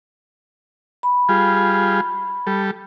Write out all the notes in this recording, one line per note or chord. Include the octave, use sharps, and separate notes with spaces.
B5
G3 F4 G#4
G3 A4